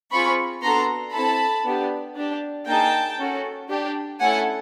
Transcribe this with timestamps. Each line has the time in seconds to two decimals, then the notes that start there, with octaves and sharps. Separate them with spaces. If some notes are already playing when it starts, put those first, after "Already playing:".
0.11 C4 F4 G#4 B5 C#6
0.62 B3 D4 F#4 A4 A#5 C6
1.13 C4 E4 A4 A5 B5
1.65 B3 D4 G4
2.16 D4 G4
2.67 A#3 D#4 G#4 G5 A5
3.18 C#4 F#4 A4
3.70 D4 G4
4.20 A3 C#4 E4 A4 F#5 G#5